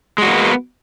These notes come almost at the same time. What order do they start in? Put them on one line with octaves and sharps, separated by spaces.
G#3 F#4 A#3 B3